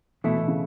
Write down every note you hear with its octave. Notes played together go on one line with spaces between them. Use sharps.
B2 E3 A3 E4
B2
C#3